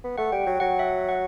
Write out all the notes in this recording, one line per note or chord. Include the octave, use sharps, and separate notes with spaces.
B3
A3 F#5
G3 G5
F#3 G5
F#3 F#5
E5
F#5
F#5